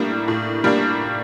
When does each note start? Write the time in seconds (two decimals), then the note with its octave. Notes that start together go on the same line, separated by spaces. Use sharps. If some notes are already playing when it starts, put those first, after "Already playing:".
Already playing: A2 G3 A#3 D4
0.28 A2
0.64 G3 A#3 D4